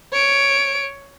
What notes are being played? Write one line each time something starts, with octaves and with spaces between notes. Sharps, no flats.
C#5 D7